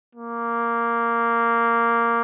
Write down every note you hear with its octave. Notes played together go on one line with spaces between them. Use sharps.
A#3